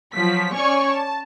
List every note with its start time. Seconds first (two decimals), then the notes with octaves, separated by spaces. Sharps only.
0.15 F3 F#3 B6
0.54 C#4 C#5 D5 G#5 C#6
0.90 A5